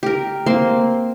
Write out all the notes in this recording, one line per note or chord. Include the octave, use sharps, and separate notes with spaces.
G4 A#4
A#3 C4 C6